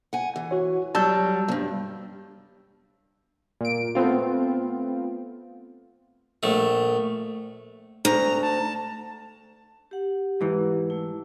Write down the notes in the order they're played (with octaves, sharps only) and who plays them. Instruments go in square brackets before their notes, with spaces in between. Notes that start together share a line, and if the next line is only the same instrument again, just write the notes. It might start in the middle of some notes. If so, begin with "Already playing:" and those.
[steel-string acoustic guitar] F#5 G#5
E3
[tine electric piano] F#4 C#5
[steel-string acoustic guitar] F#3 G3 [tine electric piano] A5 E6 G6
[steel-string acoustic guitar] E2 G2
[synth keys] A#2 D7
A3 B3 C4 F4
[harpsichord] A#1 A3
[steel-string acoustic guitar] D2 [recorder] A#5
[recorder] A5
[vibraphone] G4 F#5
[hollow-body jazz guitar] G#2 E3
[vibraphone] A3 E4